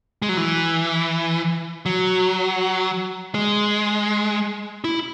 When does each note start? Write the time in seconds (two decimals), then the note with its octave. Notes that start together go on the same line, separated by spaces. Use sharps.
0.22 G#3
0.29 F#3
0.37 E3
1.86 F#3
3.34 G#3
4.84 E4